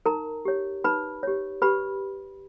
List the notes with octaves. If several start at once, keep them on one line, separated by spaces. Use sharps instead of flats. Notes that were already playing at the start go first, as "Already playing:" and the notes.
D#4 A#4 A#5
G4 C#5
D#4 B4 B5
G4 C#5
G4 B4 B5